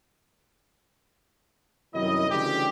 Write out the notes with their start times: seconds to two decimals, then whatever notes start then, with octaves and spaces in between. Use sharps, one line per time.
1.94 C2 F#2 D#3 E4 D#5
2.30 D2 C#3 E3 G3 G4